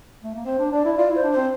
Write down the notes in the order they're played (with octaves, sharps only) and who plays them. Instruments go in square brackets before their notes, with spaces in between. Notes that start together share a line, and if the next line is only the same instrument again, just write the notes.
[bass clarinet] A3
A#3
[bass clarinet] C4 [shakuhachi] C5
[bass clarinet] D4
[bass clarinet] D4 [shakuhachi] D5
[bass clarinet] E4
[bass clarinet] F4 [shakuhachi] D5
[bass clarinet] E4 [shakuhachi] C5
[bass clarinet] D4
[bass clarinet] C4 [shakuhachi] C5